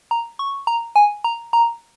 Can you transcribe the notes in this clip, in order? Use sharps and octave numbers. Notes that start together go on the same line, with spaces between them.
A#5
C#6
A#5
G#5
A#5
A#5